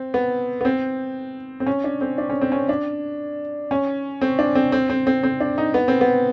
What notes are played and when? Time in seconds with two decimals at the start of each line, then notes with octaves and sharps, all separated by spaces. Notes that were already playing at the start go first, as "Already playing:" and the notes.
Already playing: C4
0.14 B3
0.61 B3
0.65 C4
1.60 C4
1.66 C#4
1.84 D4
2.01 C4
2.18 D4
2.30 C#4
2.41 C4
2.52 C#4
2.69 D4
3.71 C#4
4.21 C4
4.39 D4
4.55 C4
4.72 C4
4.90 C4
5.07 C4
5.23 C4
5.40 D4
5.58 D#4
5.74 B3
5.88 C4
6.01 B3